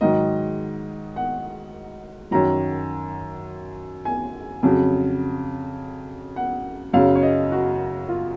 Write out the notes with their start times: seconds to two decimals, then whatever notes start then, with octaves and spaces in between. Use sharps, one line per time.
0.01 G#2 D#3 F#3 D#5
1.16 F#5
2.31 F#2 D#3 F#3 A#5
4.05 G#5
4.63 F2 C#3 F#3
6.36 F#5
6.93 F#2 C#3 F#3 F5
7.15 C#5
7.23 D#5
7.52 F#4
8.09 F4